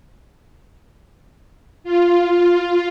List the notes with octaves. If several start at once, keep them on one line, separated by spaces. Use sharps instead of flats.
F4